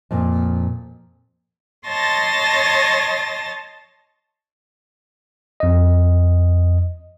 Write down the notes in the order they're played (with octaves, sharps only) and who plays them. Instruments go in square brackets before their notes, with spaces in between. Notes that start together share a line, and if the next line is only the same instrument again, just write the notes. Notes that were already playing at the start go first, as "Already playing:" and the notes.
[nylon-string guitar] F2 A#2
[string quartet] C#5 D#5 A5 C6 A6 A#6
[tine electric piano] F2 D#5